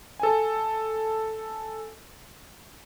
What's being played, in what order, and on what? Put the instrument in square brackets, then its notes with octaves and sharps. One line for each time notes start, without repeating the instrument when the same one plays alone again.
[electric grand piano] A4 G#5